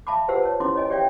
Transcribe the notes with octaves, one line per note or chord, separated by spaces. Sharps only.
E5 F5 A5 B5 D6
F4 G4 B4 C5 F#5 E6
C#5 A5
C#4 E4 C6 D6
C#5 D#5 G#5
G4 C#5 D5 E5 F5 G5